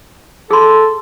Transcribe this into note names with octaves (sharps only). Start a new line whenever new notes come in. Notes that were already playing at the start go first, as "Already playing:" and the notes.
G#4 A4 C6